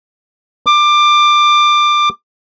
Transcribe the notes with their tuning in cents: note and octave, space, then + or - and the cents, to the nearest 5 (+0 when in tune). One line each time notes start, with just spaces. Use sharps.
D6 +20